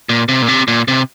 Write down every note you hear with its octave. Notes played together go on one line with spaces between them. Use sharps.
A#2
C3
A#2
C3
A#2
C3